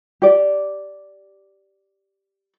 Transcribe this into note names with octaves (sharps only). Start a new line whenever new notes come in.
G4 D5